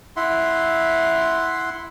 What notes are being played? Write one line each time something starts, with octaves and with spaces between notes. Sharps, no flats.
E4 E5 F#5 C6